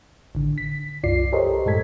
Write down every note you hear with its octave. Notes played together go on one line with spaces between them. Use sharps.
A1 D3
B6
C2 F#2 F4 D5 C7
G4 A4 A#4 C5 C#5 D#5
F#2 A2 G#3 A4 G#6 B6